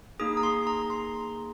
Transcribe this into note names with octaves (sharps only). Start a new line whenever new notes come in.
A#3 D#4 G#4 D#6
A#5
C6
A#5
C6